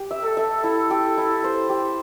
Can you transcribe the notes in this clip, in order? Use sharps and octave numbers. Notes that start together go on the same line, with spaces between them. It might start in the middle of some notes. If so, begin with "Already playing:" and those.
Already playing: G4
E5
A4
E5
E4
G4
E4
C5
G4